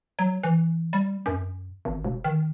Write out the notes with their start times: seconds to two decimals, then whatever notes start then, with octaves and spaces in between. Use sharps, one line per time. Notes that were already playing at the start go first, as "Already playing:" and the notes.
0.19 F#3
0.43 E3
0.93 G3
1.26 F#2
1.85 G#1
2.05 E1
2.24 D#3